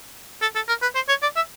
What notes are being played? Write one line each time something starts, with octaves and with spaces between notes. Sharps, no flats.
A4
A4
A#4
B4
C5
C#5
D5
E5